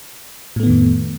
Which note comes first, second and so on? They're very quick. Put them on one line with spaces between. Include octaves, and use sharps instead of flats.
A2 A3 B3 D#3 F2